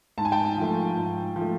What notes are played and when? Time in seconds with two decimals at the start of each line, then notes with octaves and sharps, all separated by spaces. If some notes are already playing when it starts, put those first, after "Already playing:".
0.18 G#2 A5
0.25 G#5
0.32 G5 A5
0.57 F3 A3
0.97 G#2
1.36 F3
1.41 A3